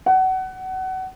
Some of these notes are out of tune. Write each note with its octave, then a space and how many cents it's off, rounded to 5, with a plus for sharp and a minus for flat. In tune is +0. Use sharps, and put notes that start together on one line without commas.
F#5 +25